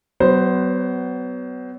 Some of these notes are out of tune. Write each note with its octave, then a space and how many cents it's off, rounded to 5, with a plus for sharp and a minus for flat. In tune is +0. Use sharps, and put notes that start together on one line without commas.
F#3 +30 B3 +25 C5 +0